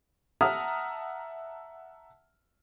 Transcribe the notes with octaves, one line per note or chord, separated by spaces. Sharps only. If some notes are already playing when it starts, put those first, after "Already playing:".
E5 F#5 A5 A#5 D#6 F6